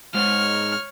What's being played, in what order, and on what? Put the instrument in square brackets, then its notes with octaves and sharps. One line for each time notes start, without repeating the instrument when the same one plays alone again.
[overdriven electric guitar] G#2 [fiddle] C#5 F6